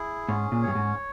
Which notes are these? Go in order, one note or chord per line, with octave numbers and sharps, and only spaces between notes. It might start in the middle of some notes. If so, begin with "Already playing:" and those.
Already playing: E4 G#4
G#2 C#4
A#2
G2 C#5
G#2